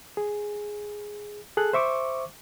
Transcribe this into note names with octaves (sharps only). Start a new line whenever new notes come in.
G#4
G#4 A4 F#6
C5 E5 C#6 D6